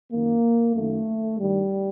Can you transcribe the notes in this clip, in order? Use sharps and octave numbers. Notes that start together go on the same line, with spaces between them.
F#2 D#3 A#3
F#2 D#3 A3
G2 D#3 G3